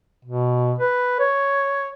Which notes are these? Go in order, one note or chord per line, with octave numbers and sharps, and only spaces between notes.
B2
B4
C#5